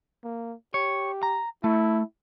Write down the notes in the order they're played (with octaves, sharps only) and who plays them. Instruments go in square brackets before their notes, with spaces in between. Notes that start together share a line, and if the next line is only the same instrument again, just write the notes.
[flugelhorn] A#3
[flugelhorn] G4 [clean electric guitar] C#5
[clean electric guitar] A#5
[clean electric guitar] A3 [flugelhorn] E4